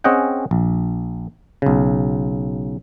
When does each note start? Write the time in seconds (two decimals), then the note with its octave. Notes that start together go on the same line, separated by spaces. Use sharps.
0.04 C4 C#4 G#4 D#5 F#5 G5
0.51 A#1
1.62 B1 C#3